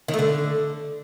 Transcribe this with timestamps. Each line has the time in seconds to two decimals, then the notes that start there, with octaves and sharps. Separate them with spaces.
0.08 D#3
0.14 A3
0.19 D3